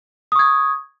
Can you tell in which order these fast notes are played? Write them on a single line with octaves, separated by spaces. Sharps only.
D#6 C#6 G#6